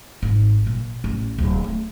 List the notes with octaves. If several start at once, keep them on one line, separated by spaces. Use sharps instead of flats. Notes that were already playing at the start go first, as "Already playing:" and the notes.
G#1
A#2
A1
D1
A3